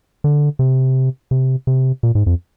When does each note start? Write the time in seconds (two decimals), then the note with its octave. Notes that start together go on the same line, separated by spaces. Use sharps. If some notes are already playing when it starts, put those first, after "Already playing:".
0.24 D3
0.59 C3
1.31 C3
1.67 C3
2.03 A#2
2.15 G#2
2.26 F2